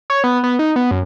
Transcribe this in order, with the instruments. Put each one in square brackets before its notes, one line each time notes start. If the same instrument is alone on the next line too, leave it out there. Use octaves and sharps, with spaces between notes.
[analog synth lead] C#5
B3
B3
D#4
B3
F#2